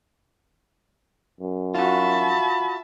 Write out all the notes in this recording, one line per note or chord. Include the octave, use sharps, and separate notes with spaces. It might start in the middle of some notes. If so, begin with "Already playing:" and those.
F#2
F4 F#4 E5 A5 B5